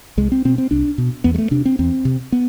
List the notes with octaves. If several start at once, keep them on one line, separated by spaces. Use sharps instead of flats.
C2 G#3
C4
B2 C4
C4
C2 D4
B2
E2 B3
G#3
A3
C3 D4
C4
E2 C4
C3
B3